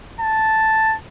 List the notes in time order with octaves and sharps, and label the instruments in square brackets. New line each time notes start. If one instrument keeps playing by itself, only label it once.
[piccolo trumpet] A5